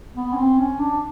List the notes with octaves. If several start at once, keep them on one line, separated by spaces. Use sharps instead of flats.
B3
C#4
C4
C#4
D4